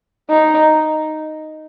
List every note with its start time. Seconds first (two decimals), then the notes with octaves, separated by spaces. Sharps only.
0.30 D#4